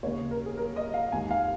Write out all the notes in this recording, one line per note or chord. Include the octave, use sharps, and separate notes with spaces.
D#2 C#3 A#3 C#5
A#4
G#4
A#4
D#5
F5
D#2 D#3 G#3 G#5
F5